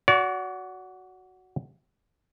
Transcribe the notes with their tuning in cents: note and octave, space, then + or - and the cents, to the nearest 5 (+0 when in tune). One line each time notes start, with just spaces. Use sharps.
F#4 +0 D5 -40